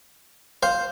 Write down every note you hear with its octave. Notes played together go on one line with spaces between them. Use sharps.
C5 F5